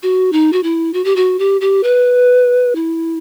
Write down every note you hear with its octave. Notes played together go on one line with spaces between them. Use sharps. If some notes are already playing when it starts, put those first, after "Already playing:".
F#4
D#4
F#4
E4
F#4
G4
F#4
G4
G4
B4
E4